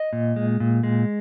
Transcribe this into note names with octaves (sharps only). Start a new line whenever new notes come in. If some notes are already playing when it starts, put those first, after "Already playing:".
Already playing: D#5
A#2
G#3
A#2
G#3